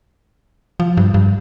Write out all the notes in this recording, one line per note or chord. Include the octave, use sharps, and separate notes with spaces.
F3
G2
G2